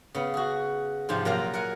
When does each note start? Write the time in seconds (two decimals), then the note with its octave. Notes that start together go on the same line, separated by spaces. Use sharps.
0.14 C#3 B3
0.34 F#4 G#4
1.09 G#2 C3 F3 G3
1.25 A#2 F#3 A#4 F5
1.53 A#4 F#5 G#5